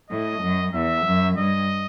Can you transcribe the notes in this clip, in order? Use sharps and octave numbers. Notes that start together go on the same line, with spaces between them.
A2 D#5
F#2
E2 E5
F#2
G2 D#5